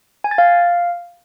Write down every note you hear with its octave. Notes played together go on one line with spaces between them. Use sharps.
G#5
A6
F5